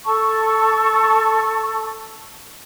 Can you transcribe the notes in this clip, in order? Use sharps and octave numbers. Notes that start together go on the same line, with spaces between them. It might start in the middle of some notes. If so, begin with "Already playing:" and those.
A4 A5 C#6